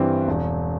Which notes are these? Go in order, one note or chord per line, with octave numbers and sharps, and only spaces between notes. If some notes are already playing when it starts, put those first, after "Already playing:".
Already playing: G2 E3 G3 C4
E1